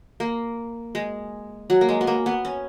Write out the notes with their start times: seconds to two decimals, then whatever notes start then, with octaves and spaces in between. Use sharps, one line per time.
0.20 A#3
0.95 G#3
1.70 F#3
1.81 A#3
1.89 G#3
2.01 B3
2.07 A#3
2.26 B3
2.45 C#4